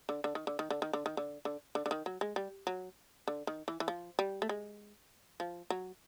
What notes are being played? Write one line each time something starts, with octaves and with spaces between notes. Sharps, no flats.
D3
D3
D#3
D3
D#3
D3
D#3
D3
D#3
D3
D3
D3
D3
D#3
F#3
G#3
G3
F#3
D3
D#3
E3
E3
F3
G3
A3
G#3
F3
F#3